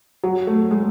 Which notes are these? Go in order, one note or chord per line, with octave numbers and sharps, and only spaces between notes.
F#3
A3
G#3